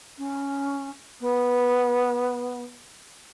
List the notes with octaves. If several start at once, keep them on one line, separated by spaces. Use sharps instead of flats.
C#4
B3